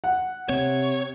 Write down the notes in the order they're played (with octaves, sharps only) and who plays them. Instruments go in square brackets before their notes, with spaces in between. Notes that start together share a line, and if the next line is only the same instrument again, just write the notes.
[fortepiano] F#5
[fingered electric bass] C3 C4 [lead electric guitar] C#5